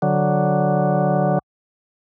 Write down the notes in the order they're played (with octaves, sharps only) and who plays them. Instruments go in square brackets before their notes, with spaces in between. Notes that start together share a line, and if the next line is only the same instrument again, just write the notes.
[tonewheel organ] D3 F#3